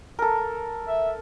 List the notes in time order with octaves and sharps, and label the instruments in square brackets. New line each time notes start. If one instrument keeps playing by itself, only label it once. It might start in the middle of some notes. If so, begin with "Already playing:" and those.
[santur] A4 A#4
[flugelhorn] E5